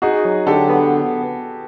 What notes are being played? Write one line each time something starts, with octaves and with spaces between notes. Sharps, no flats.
D#4 F#4 G#4
F#3
D3 G4 A4
B3